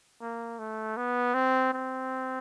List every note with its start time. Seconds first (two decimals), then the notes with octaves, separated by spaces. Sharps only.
0.21 A#3
0.59 A3
0.97 B3
1.34 C4
1.73 C4